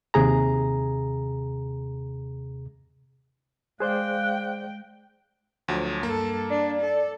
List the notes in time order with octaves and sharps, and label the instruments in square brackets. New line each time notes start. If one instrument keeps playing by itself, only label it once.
[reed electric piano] D#2 C3 G#4 A#5
[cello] G#3 G5 [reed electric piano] G#4 C5 D5 [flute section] F5 F#6
[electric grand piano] D2 F3 F#3
[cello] G2 A4 [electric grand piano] A#3
[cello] D4 [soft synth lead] D5
[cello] A4